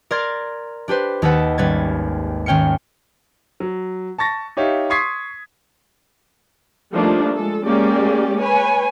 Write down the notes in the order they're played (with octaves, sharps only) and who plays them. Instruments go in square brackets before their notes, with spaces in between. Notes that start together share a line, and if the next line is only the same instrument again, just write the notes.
[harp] A#4 D5 A#5 C6 G#6 A6
D4 G4 B4 C5
D#2 D#4 A4 B4 F#5 A5
G#1 G3 C#4 B4 G#6 A6
G#1 C#4 G5 F6 C#7
[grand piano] F#3
A5 C#6 A6 A#6
D#4 G4 C#5 E5 F5
C6 C#6 D#6 G#6 B6 C7
[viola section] F3 G3 A3 A#3 D4 D#4
G#3 A4
G#3 A#3 C#4 G4 D5
B4 C#5 G#5